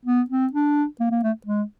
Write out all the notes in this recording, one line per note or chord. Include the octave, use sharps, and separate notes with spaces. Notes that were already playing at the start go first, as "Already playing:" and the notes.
B3
C4
D4
A#3
A#3
A3
G#3